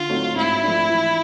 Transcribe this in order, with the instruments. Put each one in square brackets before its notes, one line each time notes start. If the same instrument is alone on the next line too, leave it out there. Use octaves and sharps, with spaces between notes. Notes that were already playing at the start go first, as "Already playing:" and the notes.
Already playing: [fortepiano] D3 [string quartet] F4
[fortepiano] F#3 A3 C4 D#4
[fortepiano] G#2 [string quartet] E4
[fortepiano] F3 A3 D4
E3